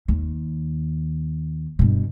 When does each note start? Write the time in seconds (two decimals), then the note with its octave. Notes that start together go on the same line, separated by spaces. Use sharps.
0.08 D#2
1.79 G2 B2